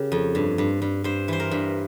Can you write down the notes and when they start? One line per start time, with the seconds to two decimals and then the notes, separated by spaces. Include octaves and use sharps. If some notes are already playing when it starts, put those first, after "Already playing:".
Already playing: C#3 G4 A#4
0.12 F2
0.35 G2
0.58 G2
0.82 G2
1.04 G2 C5
1.28 E3 C5
1.40 A#4
1.51 G2